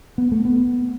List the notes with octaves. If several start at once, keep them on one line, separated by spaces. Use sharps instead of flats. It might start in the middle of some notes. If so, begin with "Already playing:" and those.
B3
A3
B3